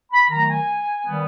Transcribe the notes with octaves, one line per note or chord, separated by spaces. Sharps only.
B5
D#3 F#3 A3 A#5
G#5
D#3 G3 B3